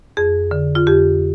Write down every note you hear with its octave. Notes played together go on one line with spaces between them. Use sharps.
F2 G#4
D3
F4
F2 G4